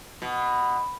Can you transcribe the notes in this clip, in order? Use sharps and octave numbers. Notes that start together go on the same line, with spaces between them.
B2